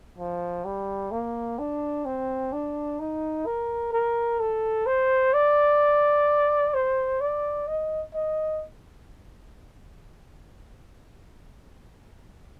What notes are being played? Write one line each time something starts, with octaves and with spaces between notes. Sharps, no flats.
F3
G3
A#3
D4
C4
D4
D#4
A#4
A#4
A4
C5
D5
C5
D5
D#5
D#5